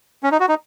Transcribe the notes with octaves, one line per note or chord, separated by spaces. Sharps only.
C#4
D#4
F#4
D#4